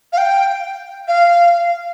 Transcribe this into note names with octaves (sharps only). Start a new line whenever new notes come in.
F5
G5
F5